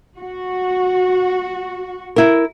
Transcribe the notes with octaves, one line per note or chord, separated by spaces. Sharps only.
F#4
E4 A#4